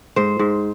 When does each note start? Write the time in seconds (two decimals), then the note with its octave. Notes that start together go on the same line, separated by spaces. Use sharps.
0.16 G#2 C5
0.39 G#2